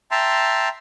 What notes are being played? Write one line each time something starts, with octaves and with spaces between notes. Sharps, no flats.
E5 G5 A5 A#5 C6